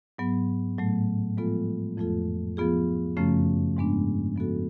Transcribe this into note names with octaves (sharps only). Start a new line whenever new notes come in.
G#2 F#3 B3
A2 F#3 A3
F3 G#3 B3 F4 A4
F2 F3 A3 F4 A4
F3 B3 F4 G#4
F#2 C#3 F3 A3 C#4
G#2 G#3 B3 D4
F3 B3 F#4 A4